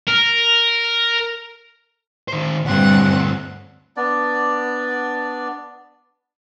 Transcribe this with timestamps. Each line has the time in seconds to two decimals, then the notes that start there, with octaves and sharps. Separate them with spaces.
0.07 A#4
2.28 D#3 C5
2.65 D2 G2 C4 F#5
3.97 B3 D4 D5